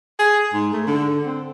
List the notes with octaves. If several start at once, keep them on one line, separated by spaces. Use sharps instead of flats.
G#4
G#2
A3
D3
C4